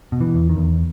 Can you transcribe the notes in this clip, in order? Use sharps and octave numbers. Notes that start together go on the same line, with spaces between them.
B2
E3
E2
D#3
E2